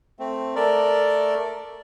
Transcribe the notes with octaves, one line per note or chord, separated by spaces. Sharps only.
A3 C4
A3 A4 A#4 D5